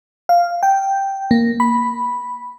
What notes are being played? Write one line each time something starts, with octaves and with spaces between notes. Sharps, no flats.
F5
G5
A#3
B5